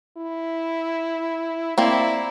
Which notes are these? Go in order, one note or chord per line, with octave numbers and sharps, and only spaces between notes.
E4
A#3 C4 E4 D5